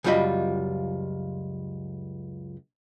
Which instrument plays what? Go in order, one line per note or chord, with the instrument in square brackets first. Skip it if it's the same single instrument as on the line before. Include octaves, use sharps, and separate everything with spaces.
[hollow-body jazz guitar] C#2 F#2 G3 F4 D#5 B5